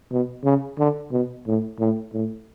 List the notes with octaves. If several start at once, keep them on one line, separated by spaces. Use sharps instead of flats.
B2
C#3
D3
B2
A2
A2
A2